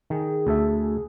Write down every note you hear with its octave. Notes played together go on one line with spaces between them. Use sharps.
D#3 G#4
D2 A4 E5